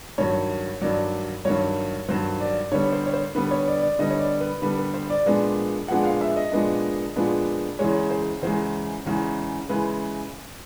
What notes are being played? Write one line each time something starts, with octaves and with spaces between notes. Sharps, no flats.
G2 D#3 F#3 C#5
G2 D#3 F#3 D5
G2 D#3 F#3 C#5
G2 D#3 F#3 C5
D5
D3 G3 B3 C#5
C5
C#5
C5
D3 G3 B3 B4
C#5
D5
D5
D3 G3 B3 D#5
C#5
D5
B4
D3 G3 B3 B4
B4
C5
D5
A#2 F3 G#3 B3 D4 D5
A#2 F3 G#3 B3 D4 F#5
F5
E5
D#5
A#2 F3 G#3 B3 D4
A#2 F3 G#3 B3 D4
E2 C#3 E3 G#3 C#5
C5
E2 C#3 E3 G#3 C5
E2 C#3 E3 G#3
C#3 E3 G#3 B4